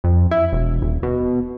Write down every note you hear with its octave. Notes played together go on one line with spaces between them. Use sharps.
F2
E4
E1
D#1
B2